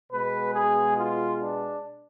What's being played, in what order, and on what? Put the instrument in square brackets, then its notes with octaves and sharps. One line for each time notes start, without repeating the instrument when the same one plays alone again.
[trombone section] B2 G#3 B3 B4
G#4
F4
D4